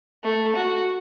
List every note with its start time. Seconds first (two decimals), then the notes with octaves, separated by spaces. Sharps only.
0.24 A3
0.55 F#4